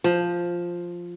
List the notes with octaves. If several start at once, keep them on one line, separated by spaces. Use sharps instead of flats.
F3